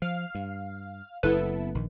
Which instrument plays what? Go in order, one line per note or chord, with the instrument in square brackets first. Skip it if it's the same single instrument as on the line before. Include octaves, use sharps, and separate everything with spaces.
[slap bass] F3 [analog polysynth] F5
[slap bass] G2
[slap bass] F#1 [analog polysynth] B3 E4 A4 [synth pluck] B4
[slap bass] A#1 D#3